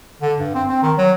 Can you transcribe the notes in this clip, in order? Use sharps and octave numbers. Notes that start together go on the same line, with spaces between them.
D3
G2
C4
C4
D#3
F#3